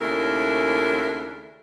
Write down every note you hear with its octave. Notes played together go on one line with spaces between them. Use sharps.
D#2 C#3 A3 D4 E4 A#4